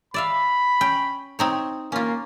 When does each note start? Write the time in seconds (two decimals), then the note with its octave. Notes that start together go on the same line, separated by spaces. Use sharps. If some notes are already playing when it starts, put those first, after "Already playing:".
0.14 D5 E5 F5 B5
0.81 C#4 G5
1.39 C4 D#4 C#5
1.92 A#3 C#4 F4